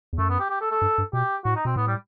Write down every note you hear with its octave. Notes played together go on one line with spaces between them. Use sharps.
E2
F#2 A3
B3
G4
G4
A4
A4
G2
G2
B2 G4
A2 F#4
D#4
B2 C4
A2 B3
G3